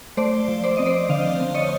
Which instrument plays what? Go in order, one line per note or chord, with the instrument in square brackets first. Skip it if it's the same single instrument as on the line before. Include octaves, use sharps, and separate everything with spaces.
[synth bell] A3 C5 D5
F3
C5 D5
C4 D#5
C5 D5
D3 D#5 F5
C4
C#5 D#5